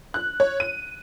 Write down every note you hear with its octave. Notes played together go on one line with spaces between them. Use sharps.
F#6
C#5
D#7